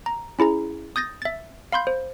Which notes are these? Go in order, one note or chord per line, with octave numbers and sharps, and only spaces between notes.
A#5
C#4 E4 G#4 A#5
D#6 G6 A6 A#6
E5 A6
F5 B5 C6 G6
C5